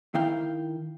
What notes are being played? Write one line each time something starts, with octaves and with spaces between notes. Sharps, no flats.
D#3 E4 F5 G5